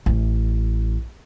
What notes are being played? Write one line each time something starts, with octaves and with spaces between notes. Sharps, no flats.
A1 A3